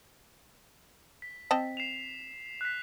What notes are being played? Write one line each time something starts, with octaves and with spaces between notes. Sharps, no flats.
B6
C4 D#5 A5
C7 E7 F7
F#6 B6